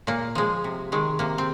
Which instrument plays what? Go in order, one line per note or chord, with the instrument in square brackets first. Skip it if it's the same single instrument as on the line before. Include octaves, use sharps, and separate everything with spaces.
[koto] A#2 A#3
F3 G#3
C3
D#3 G#3
C3 A#3
C4